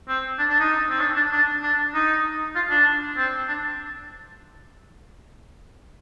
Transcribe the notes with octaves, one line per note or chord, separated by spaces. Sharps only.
C4
D4
D4
D#4
C4
D4
D4
D4
D4
D#4
F4
D4
C4
D4